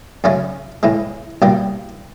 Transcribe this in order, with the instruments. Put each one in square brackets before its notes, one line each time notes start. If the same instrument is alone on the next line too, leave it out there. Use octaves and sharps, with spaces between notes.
[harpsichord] F#2 C#3 F#3 A3 C#4
A2 E3 G#3
C2 B2 G3 A#3